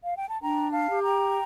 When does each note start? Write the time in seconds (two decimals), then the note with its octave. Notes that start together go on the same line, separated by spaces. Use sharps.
0.04 F5
0.17 G5
0.29 A5
0.42 D4 G5 A#5
0.72 F5 A5
0.89 G4
1.04 G5 A#5